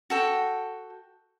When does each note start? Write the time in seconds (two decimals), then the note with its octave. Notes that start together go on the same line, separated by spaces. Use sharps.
0.10 F#4 A4 G5